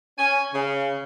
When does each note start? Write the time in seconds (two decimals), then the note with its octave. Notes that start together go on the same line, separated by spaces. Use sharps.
0.19 C#4 G#5
0.54 C#3